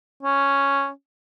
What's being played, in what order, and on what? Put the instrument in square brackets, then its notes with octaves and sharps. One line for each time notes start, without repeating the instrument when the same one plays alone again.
[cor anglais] C#4